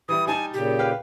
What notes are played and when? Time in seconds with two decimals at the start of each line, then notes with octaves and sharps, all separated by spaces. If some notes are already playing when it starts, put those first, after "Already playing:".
0.09 E3 G3 E4 D#6
0.27 G3 D#4 G#5 A5
0.54 A#2 C#3 G4
0.79 B4 F5 G5